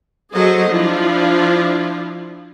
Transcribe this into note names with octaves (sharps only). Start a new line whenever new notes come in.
F#3 F#4 G#4 A4 C5 D#5
F3 D4 E4 F4